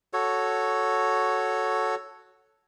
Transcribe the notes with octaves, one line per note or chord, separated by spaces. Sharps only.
F#4 A4 C#5